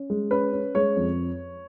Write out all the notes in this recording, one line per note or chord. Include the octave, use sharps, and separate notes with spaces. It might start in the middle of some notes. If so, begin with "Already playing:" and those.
Already playing: C#4
G#3
C#4 B4
C#4
G#3 C#5
F2